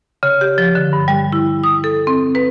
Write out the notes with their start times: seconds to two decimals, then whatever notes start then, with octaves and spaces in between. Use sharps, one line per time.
0.23 C#3
0.41 G4
0.58 F3
0.75 D3
0.93 G2
1.08 G3
1.33 E4
1.64 D#6
1.84 A4
2.07 C4
2.35 B4